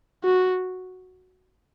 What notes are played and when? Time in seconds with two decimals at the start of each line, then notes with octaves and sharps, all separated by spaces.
0.24 F#4